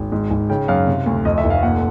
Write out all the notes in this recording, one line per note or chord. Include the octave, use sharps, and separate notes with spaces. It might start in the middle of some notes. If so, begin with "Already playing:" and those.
Already playing: G#1
G#2
G#1
C#3 G5
F#2 F5
C3
D2
F2 D#5
E5
F1
F5
A#2 F#5